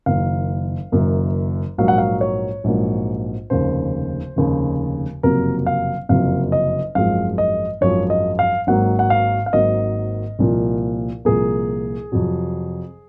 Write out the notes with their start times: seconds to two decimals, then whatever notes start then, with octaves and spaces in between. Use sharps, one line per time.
0.06 F#1 F#2 D#3 A#3 F5
0.92 F#1 F#2 D#3 A#3
1.78 A#1 G#2 F#3 A#3 F5
1.88 F#5
1.98 F5
2.21 C#5
2.64 A#1 G#2 F#3 A#3
3.50 F1 D#2 C#3 C5
4.36 F1 D#2 C#3
5.23 F#1 F2 C3 F#3 A#3 A#4
5.66 F5
6.09 F#1 F2 C3 F#3 A#3 F5
6.52 D#5
6.95 G#1 F#2 F3 G#3 F5
7.38 D#5
7.81 G#1 F#2 F3 G#3 C#5
8.10 D#5
8.39 F5
8.67 G#1 G#2 F#3 A#3 F#5
8.99 F#5
9.10 F5
9.46 F5
9.53 G#1 G#2 F#3 A#3 D#5
10.39 C2 A#2 F3 A#3
11.25 C2 A#2 F3 A#3 G#4
12.12 F2 C3 F#3